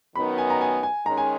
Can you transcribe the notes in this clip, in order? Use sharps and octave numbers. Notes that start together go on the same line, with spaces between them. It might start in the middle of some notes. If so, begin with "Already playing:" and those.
F#2 D#3 F#3 B3 D#4 B5
G#5
A#5
G#5
G#5
D#3 G#3 C#4 A#5
G#5